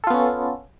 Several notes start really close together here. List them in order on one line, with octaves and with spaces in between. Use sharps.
A4 F4 B3 C#4